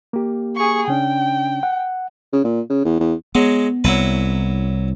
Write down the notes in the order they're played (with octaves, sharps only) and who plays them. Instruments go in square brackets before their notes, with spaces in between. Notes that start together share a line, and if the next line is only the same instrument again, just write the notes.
[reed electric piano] A#3 G4
[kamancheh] G#4 C#6
[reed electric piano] C#3 C#4 D4 [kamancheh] G5
[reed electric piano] F#5
[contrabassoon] C#3
A#2
C#3
E2
E2
[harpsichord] F#3 G#3 [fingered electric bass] B3
[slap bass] C2 [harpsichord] F#3 E4 B4